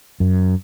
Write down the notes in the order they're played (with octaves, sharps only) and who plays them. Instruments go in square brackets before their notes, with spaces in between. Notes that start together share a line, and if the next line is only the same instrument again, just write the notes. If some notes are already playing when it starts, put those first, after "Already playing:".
[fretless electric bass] F#2